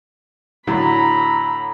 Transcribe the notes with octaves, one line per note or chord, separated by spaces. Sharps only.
A2 D3 F#3 A#5 B5